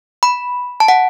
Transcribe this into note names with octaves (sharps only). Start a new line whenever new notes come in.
B5
A5
F#5